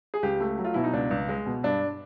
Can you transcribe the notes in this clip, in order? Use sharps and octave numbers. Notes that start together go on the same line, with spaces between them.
G#4
C#2 G4
A3
F#3
F4
B2 E4
D#4
C#2 D4
C#2
G#3
B2
G2 D4